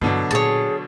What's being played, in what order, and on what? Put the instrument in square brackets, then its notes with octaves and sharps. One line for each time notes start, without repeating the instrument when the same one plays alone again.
[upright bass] G2 E4 [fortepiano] B2 D3 F#3
[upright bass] A#2 [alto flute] G#4 [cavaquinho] C#5 A5